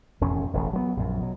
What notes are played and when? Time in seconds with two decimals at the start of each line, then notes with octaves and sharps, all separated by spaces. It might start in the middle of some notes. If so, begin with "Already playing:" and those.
0.21 E1 F2 A2 C#4
0.53 E1 A1
0.73 F#3 G#3 B3
0.97 A#1 F#2
1.20 B2 F#3